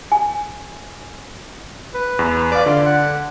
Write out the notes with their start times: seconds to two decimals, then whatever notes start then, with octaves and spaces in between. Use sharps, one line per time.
0.12 G#5
1.95 B4
2.19 E2
2.52 B4 D5 F5
2.66 D3 F4 D5
2.86 F#5